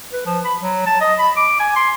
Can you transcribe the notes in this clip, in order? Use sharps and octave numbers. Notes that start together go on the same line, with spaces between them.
B4
F3
B5
F#3
A5
D#5
B5
D6
G#5
C6